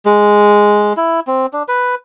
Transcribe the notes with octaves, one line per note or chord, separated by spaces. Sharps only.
G#3
E4
C4
D4
B4